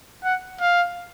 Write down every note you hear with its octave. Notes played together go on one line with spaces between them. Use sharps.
F#5
F5